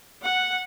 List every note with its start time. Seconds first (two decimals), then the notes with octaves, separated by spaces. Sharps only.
0.24 F#5